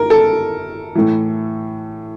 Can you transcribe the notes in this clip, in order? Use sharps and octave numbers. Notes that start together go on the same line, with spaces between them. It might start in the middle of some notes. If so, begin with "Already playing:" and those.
Already playing: A#4
A4
A2 E3